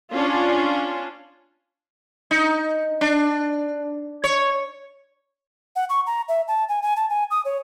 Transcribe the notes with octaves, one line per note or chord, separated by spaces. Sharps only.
C#4 D4 F4
D#4
D4
C#5
F#5
C#6
A#5
E5
A5
G#5
G#5
A5
G#5
D#6
C#5